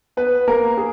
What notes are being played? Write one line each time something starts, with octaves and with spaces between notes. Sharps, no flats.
B3 B4
A#3 A#4
G#4